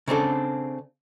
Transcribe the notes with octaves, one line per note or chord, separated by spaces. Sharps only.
C#3 C4 D4 A4